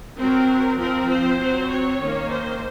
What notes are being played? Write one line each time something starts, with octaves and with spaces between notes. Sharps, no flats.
F#3 C4 A#4
F3 C4 A#4
C5
F#3 C4
C#5
D#3 A#3 C#4
C5